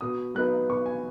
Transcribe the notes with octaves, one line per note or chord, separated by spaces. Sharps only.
B2 D#6
F#3 B3 D#4 F#6
B2 C#6
G#5